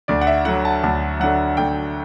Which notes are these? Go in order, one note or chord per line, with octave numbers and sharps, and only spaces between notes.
D2 D5
F#5
E5
D3 F#3 F#5
A5
D2 A5
D3 F#3 F#5
D2 G5